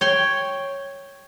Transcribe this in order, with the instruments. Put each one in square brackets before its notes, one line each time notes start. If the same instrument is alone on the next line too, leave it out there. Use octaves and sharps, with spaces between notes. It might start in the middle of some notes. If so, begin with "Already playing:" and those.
[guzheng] C#5 G5 C6